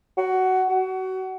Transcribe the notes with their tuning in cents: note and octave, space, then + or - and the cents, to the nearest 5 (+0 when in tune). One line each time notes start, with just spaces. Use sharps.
F#4 +15
F#4 +25